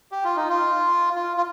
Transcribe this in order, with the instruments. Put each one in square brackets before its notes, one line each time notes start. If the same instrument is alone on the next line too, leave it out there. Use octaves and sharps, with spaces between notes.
[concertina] G4
F4
D#4
F4
F4
F4